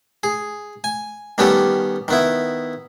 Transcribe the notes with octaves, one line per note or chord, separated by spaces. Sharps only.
G#4
G#5
D#3 G3 B3 C#4 G4 A4
D#3 B3 E4